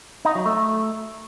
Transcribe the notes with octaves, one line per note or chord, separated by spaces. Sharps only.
D#4
F#3
A3